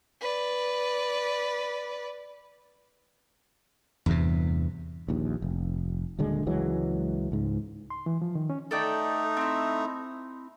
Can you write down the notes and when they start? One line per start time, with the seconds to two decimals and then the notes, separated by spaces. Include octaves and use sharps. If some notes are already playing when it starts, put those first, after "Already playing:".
0.21 B4 D5
4.06 E2 G2 C3
5.08 A#1 D#2
5.42 F1
6.19 D#1 D2 D3 G#3
6.46 C#2 E3 F#3 G#3
7.32 C#2 G#2
7.90 C6
8.06 E3
8.22 F3
8.35 D#3
8.50 C#4
8.71 A3 D#4 A4 D5 G5
9.37 C4 E4